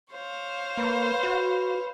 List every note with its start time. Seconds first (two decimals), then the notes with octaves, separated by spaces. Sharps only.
0.12 C5 C#5 F5
0.77 A#3 B4
1.23 F#4